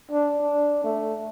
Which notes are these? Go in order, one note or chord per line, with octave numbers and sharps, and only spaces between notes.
D4
D4
A3